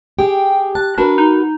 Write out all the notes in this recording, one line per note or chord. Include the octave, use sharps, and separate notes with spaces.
G4 G#4 G5
A5 F#6
D4 F#4 A#4 B4
D#4